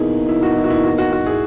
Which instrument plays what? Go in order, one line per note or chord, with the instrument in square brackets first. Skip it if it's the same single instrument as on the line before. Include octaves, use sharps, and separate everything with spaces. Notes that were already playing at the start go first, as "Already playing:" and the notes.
Already playing: [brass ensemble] E2 B2 A#3 D#4 [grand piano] E4 G#4
[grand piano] E4
F#4
E4
F#4
E4
F#4
F#4
F#4
E4 G#4